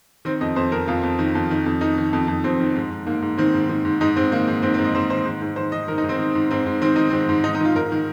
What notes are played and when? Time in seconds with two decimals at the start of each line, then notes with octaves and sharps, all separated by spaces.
0.25 D#3 C4
0.41 F2 D#5
0.56 F2 C5
0.72 F2 A#4
0.88 F2 F4
1.03 F2
1.19 D#3
1.35 F2
1.51 D#3
1.66 F2
1.81 D#3 D#4
1.98 D#3
2.13 F2
2.28 F2
2.44 F2 C4
2.59 D#3
2.75 G#2
2.90 G#2
3.06 G#2 A#3
3.22 G#2
3.38 D#3 C4
3.54 G#2
3.69 D#3
3.85 G#2
4.01 G#2 D#4
4.16 G#2 C4
4.32 D#3 A#3
4.48 G#2
4.63 G#2 C4
4.74 C4
4.78 G#2
4.84 D#5
4.94 G#2 C5
5.10 D#3 C5
5.25 G#2
5.42 G#2
5.56 D#3 C5
5.72 D#3 D#5
5.88 D#3 A#4
5.98 D#4
6.04 G#2
6.09 C4
6.19 D#3
6.35 G#2
6.51 G#2 C4
6.66 G#2
6.81 D#3 C4
6.96 D#3 D#4
7.10 G#2 C4
7.29 G#2
7.44 G#2 D#4
7.55 D#4
7.61 D#3 F4
7.76 G#2 A#4
7.92 D#3